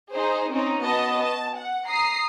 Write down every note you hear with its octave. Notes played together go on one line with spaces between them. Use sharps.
D#4 G#4 C5
C4 C#4 D#4
B3 F#4 D#5 A5
A5
F#5
A#5 D#6 C7